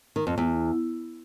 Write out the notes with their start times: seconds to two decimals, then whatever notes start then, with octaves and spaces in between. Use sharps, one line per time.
0.16 D#3
0.27 F2
0.38 E2